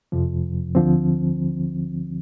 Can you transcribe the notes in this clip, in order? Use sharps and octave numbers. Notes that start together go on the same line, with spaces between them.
F2 C3 F3
D2 D3 F3 C4